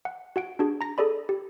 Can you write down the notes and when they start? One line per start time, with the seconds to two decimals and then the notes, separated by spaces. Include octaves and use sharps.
0.05 F#5
0.36 F#4 F#5 D7
0.59 D4 F#4 G#4
0.81 A#5 A#6
0.98 G#4 A4 D5 B5
1.29 G4